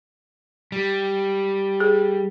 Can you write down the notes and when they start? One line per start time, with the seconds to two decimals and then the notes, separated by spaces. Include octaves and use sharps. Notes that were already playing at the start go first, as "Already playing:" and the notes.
0.72 G3
1.80 G#4